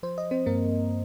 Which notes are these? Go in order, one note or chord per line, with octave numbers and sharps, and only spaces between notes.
F3 C5
D#5
C4 C5
G2 A#3 A#4